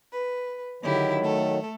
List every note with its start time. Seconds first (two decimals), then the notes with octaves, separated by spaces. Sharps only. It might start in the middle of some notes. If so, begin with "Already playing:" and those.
0.12 B4
0.83 D3 D#3 F#3 E4 G4
1.19 A3 A4